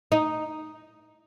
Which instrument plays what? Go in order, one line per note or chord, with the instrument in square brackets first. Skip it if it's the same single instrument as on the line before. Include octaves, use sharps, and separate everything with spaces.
[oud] D#4